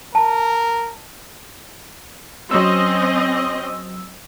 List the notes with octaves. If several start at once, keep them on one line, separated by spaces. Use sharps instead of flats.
A#4 A5
F#3 C4 C#4 D#5 E6